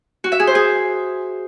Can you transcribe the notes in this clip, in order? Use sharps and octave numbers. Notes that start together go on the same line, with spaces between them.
F#4
E5
G#4
C5
G#4